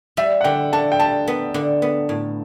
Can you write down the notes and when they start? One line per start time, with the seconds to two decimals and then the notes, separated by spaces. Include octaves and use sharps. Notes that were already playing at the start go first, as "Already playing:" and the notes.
0.17 G3 E5
0.41 F#5
0.44 D3 G5
0.73 D3 A5
0.92 G5
0.99 G3 A5
1.28 B3
1.54 D3
1.82 B3
2.09 A2